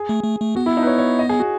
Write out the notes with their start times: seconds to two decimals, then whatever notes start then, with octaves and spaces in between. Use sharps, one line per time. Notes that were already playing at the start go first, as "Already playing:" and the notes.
Already playing: G#4
0.09 A3
0.24 A3
0.40 A3
0.56 B3 F#4
0.66 E4
0.77 D#4
0.83 B4
0.87 C#5
0.98 C#5
1.19 D#5
1.29 G#4
1.40 F#4